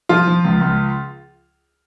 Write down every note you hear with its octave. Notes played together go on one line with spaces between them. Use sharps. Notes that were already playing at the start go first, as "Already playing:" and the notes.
F3 F4
F3
C#2
C#2